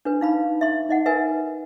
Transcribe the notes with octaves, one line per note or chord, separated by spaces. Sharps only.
D4 B4
D#4 F5 B5
E5 C6
D#4 D#5 F#5
A#4 B4 E5 G#5